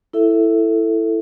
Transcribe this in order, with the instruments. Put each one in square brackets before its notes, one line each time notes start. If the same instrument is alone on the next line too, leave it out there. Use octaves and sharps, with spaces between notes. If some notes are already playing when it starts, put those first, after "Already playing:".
[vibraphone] E4 A4 E5